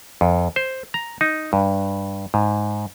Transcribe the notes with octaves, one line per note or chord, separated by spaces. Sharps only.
F2
C5
A#5
D#4
G2
G#2